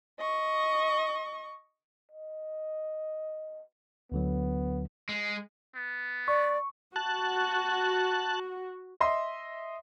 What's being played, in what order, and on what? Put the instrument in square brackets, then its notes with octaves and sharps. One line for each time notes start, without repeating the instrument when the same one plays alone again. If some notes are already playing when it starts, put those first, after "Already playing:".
[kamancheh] D#5 C#6
[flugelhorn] D#5
[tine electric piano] D2 D3 F#3 [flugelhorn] B3
[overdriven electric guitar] G#3
[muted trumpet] B3
[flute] D5 [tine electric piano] C#6
[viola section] F#4 [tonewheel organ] A5 F#6
[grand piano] D#5 E5 C6